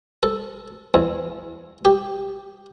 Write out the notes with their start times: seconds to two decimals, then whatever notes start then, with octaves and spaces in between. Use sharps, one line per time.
0.23 A4
0.94 E2
1.85 G4